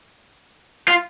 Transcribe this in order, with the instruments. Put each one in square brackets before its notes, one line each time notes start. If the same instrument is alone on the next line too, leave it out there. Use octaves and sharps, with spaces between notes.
[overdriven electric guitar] F4